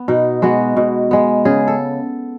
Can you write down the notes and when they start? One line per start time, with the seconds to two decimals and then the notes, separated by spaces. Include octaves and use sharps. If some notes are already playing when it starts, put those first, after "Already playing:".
Already playing: B3
0.08 B2 D#4
0.42 G#3 B3 F#4
0.77 B2
1.11 G#3 B3
1.45 C#3 G#4
1.68 A4